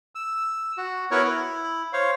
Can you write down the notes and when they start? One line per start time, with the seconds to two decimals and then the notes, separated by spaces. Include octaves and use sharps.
0.15 E6
0.77 F#4
1.11 B3 E4 F#4 A#4 C#5
1.24 E4
1.93 C5 C#5 F5